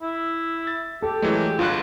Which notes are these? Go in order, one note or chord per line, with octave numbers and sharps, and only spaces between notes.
E4
A6
G4 A4
E3 F#3 G#3 A3
G1 G2 F4 F#6